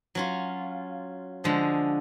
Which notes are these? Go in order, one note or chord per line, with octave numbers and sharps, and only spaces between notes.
F#3 C#4 F4
D3 F3 G#3